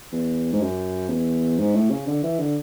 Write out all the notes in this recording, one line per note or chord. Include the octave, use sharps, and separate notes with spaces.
E2
G#2
F#2
E2
G#2
A2
C#3
D3
E3
D3